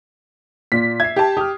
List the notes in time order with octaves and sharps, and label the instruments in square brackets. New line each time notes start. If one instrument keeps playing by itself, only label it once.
[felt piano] A#2 F4 [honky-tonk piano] B6
[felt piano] E5 C7 [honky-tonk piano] G#6
[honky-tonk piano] G4 A5
[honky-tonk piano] G4 [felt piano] D#6 F6